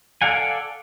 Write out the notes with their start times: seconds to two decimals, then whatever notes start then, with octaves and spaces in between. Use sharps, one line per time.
0.22 A4 D5 F5 F#5 G#5